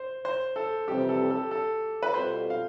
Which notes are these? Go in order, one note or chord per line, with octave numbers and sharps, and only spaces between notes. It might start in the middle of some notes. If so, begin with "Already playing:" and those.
Already playing: C5
C5
A4
F2 C3 E3 G3 C4 G4
A4
A4
A4
B4
B2 G3 C4 F4 A4 C5
F5